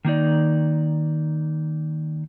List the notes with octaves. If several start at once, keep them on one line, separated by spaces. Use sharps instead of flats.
D#3 A#3 D#4 D5